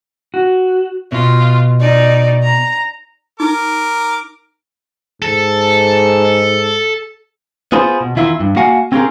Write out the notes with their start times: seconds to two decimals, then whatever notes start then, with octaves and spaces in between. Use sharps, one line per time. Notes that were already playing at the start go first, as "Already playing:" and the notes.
0.34 F#4
1.12 B2 F4
1.80 D#4 D5
2.43 A#5
3.40 D#4 A#4 D6
5.22 G#2 A4
7.72 B3 F4 G#4 B4 C5
8.01 B2
8.16 E2 D#3 E4 F4 C5 E5
8.40 G2
8.56 A#3 F#4 F5 F#5 G#5
8.92 C4 C#4 F4 G4 G#4 A#4